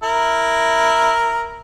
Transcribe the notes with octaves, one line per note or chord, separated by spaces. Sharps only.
E4 A#4